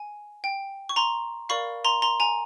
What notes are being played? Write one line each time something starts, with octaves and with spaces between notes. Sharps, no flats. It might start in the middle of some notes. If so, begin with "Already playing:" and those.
Already playing: G#5
G5
C#6
A#5 C6
A#4 D5 F5 B5 C#6
A#5 C6
A#5 C6
G#5 A#5